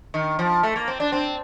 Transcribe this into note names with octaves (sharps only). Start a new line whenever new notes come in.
D#3
F3
A3
A#3
C4
D4
C4